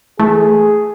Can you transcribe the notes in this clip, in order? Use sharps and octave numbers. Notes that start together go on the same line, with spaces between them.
E3 A3 G#4